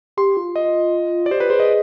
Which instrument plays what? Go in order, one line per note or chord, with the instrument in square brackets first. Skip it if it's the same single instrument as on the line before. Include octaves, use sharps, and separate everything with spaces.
[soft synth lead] G4 [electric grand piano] C6
[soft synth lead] F4
[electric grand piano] D#5
D5
[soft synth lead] G4 [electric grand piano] C5
[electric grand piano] B4
[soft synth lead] G#4 [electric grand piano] C5
[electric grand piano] D#5